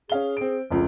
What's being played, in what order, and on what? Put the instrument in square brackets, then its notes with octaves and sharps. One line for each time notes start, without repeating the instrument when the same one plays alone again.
[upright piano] C#4 F5 G7 [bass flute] G#4
[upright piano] C4 D7
[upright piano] F1 C#2 [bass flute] F3